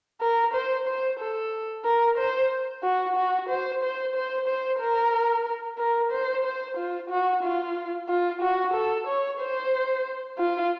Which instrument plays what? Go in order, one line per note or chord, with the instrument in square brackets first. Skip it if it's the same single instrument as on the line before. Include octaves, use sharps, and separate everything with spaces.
[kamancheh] A#4
C5
C5
A4
A#4
C5
F#4
F#4
C5
C5
C5
C5
A#4
A#4
C5
C5
F4
F#4
F4
F4
F#4
A4
C#5
C5
F4